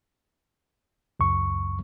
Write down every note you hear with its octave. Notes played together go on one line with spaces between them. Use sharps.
C#2 F#2 C#6